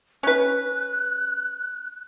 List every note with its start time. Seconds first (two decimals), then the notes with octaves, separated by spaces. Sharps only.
0.23 C#4 B4 F#6